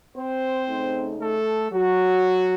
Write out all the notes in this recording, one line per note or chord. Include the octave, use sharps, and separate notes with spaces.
C4 C5
C#3 A3 D#4
A3 A4
F#3 F#4